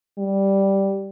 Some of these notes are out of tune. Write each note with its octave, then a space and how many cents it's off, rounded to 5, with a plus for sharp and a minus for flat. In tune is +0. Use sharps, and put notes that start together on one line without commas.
G3 -5